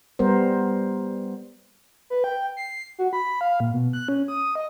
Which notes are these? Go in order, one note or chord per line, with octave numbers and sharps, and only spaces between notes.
G3 B3 A#4 C5
B4
G5
C7
F#4
B5
F5
A#2
B2
F#6
C#4
D#6
D#5